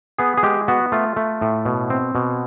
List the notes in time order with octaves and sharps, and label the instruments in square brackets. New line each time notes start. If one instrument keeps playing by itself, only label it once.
[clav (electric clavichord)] B3 G#4
G#4
G#3 G4
B3 F#4
A3 F4
A3
A2
B2
C4
B2